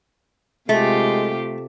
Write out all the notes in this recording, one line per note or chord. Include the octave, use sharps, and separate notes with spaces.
C3 G#3 A3 F4 G4